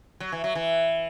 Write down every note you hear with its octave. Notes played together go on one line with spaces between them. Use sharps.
F#3
E3
F#3
E3